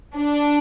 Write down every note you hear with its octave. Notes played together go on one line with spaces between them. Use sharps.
D4